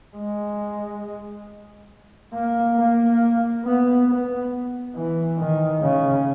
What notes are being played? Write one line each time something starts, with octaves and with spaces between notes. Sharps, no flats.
G#3
A#3
A#3
B3
B3
E3
D#3
C#3